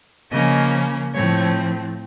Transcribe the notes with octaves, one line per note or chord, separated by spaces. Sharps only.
C#3 F3 A#3 C#4 D#5
A2 F3 A3 C4 C#5